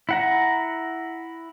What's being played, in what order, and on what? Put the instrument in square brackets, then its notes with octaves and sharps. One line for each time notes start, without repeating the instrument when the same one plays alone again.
[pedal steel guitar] E4 F#5 A#5